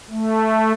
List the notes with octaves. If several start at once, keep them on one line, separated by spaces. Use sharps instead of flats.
A3